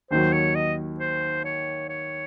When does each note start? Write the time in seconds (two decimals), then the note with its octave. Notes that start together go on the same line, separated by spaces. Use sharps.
0.11 D#2 D#3 F#3 C5
0.33 C#5
0.55 D#5
1.00 C5
1.44 C#5
1.89 C#5